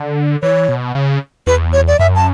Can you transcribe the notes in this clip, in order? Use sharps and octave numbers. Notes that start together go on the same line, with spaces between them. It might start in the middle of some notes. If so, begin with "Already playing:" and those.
Already playing: D3
E3 C#5
B2
C#3
E2 B4
C#5
D5
F#2 E5
A5